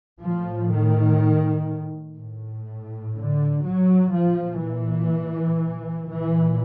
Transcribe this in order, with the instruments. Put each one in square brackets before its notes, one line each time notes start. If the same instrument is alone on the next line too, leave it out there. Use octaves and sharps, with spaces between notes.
[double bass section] A2 F3
D#3
A2
D3
F#3
A#2 F3
E3
A#2 E3